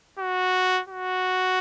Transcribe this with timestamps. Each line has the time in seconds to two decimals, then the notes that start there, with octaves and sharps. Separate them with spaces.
0.19 F#4
0.89 F#4